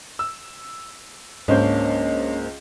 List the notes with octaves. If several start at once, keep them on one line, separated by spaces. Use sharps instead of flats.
E6
C#2 G#2 A#3 C#4 D4 C5 G6